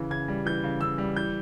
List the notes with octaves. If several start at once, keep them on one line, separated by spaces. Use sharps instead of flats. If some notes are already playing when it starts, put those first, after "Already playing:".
Already playing: C#3 E3
C#3 G#6
G3
E3 G6
C#3
C#3 E6
G3
E3 G6